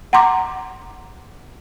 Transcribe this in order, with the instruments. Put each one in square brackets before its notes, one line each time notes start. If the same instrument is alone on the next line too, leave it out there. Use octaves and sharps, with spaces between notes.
[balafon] F#5 A#5 C6 D6